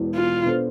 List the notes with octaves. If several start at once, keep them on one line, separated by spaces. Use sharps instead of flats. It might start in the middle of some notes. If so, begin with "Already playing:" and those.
Already playing: E1 E2 B2
F4
B2 B3 D4 A4 C5